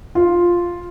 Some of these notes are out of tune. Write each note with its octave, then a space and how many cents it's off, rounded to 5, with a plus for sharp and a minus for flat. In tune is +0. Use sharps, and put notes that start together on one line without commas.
F4 +0